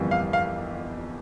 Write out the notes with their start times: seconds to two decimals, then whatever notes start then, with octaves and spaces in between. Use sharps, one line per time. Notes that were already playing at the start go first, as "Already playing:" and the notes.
Already playing: G1 F2 E3 G3 A#3
0.11 F5
0.33 F5